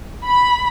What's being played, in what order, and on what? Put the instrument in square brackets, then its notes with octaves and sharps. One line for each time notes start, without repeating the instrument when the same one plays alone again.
[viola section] B5